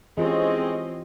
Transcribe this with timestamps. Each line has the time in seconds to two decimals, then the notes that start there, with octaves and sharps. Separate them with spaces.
0.18 E3 G#3 C4 C#4 F4 G4 D#5